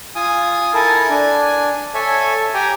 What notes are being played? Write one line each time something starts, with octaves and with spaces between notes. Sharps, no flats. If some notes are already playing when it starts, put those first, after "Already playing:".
F4 G#5 D#6
E4 A4 A#4 G#5 A5
D4 G#5
A4 C#5 E5 G#5
G4 G5 G#5 A#5